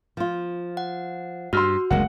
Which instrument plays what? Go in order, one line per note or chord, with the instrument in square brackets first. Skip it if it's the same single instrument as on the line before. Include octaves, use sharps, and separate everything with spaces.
[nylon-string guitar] F3 F4
[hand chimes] F#5
[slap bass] G2 [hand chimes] F#4 [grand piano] C6 E6 F6
[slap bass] F#1 D2 [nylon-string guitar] G#3 A#3 C#4 [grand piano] F#5